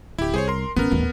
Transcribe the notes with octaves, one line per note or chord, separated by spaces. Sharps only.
D1 E4 G4
C2 G#4 C5 C#5
A#4 C6
G#1 B3 C#4 A#4
D#1 A1 D#2